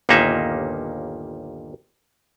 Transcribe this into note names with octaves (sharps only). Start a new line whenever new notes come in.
G1 D#2 A#2 A#3 D#4 E5